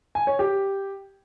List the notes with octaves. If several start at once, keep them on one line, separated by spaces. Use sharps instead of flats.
G#5
C#5
G4